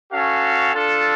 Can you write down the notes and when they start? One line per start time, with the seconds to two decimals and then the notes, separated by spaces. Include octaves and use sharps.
0.11 C#4 F#4 A4 F5
0.74 D4 F4 A4